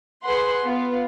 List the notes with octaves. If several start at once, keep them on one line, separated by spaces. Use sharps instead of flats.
G#4 B4 F#5 C6
B3 F4